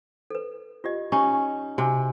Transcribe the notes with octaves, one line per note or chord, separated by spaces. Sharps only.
A4 B4
F4 G4 D#5
C#4 D#4 G4 C#6
C3 F#4 G#5